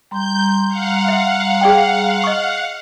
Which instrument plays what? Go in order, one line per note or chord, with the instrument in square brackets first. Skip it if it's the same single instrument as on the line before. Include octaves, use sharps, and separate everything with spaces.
[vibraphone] G3 A#5 C6 [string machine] G6
[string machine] F5 F#5
[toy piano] E5
G#4 D5 G5
D#5 C#6